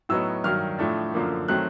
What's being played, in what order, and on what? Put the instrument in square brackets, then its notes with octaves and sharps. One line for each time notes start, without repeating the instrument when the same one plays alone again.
[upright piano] A2 F#3 B3 D#4 E6
G2 D#3 F#3 F6
A2 F3 A3 D4
F#2 D3 F3 A#3
D#3 F#3 A3 C4 F#6